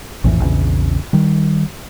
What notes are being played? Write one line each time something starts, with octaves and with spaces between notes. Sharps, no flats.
A#1 F2 A2 E3
A#1 E2 C#3
D#3 G3